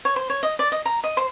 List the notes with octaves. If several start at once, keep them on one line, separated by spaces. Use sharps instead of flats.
C#5
C5
C#5
D#5
D5
D#5
A#5
D#5
C5